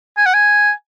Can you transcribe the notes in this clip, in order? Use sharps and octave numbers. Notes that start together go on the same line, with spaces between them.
G#5
F#5
G#5